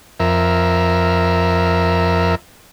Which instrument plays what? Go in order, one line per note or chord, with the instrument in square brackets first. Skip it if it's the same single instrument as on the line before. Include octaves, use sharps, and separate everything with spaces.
[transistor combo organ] F2 A#4 E5